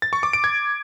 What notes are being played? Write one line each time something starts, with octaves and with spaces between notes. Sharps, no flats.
A6
C#6
D6
D7
G#6